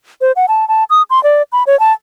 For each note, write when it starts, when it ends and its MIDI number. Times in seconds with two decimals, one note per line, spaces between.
0.21 0.32 72
0.36 0.46 78
0.48 0.67 81
0.68 0.84 81
0.90 1.02 87
1.10 1.22 84
1.24 1.42 74
1.52 1.63 83
1.67 1.78 73
1.80 1.92 81